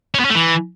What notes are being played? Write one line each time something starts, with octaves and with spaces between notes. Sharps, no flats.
C#4
B3
C#4
A3
E3